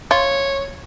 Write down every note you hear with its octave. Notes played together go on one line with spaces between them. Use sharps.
F4 C#5